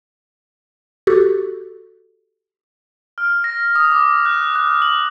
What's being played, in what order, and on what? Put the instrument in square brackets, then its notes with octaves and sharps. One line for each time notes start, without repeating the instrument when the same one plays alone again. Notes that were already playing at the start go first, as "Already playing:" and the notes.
[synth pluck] F#4 G4 A4
[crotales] F6
A#6
D#6
D6
F#6
F#6
F#7